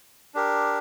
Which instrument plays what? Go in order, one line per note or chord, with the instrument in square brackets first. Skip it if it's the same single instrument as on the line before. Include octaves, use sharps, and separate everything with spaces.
[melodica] D4 G4 A#4